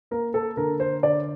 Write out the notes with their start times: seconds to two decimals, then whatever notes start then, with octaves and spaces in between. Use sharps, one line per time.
0.11 A#3 A#4
0.34 A4
0.57 D3 A#4
0.80 C5
1.03 D3 D5